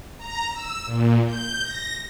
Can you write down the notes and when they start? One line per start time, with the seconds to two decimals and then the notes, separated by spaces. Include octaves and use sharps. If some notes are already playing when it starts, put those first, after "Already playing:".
0.18 A#5
0.53 E6
0.86 A#2
1.26 G6
1.63 A#6